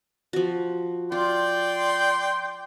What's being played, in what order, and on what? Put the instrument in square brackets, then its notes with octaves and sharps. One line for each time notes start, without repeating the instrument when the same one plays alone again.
[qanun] F3 F#4
[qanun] F4 [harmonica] D5 G5 C6